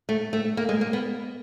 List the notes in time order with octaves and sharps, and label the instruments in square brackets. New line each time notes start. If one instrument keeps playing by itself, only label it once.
[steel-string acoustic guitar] A3
A3
A#3
G#3
A#3
B3